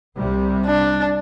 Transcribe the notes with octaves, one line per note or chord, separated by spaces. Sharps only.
C2 C3 G3
D4